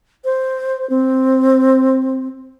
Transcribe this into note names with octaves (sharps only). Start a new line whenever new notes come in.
C5
C4